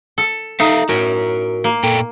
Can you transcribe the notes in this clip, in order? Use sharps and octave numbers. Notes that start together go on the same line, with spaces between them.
A4
D#4 A4 E5 F5
A2 F#4 A#4
A#3
A#2 A4 G5